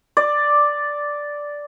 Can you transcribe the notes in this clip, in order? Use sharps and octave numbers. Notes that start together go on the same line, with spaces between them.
D5